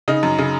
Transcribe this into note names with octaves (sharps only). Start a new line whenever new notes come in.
C#3 D#4
F#2
C#3